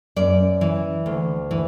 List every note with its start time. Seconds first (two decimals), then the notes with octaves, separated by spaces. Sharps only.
0.16 F#2 D5
0.61 E3
1.06 D2
1.51 E3